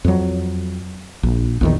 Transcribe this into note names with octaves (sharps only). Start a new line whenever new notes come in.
F2 F#3
A#1
A#1 E2 D#3